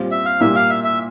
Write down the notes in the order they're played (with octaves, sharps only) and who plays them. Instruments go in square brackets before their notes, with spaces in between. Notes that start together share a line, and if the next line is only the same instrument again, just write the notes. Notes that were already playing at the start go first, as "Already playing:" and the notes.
Already playing: [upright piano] A#2 G3 C4 F4
[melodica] E5
F5
[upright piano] A#2 G3 A#3 [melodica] E5
[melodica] F5
E5
E5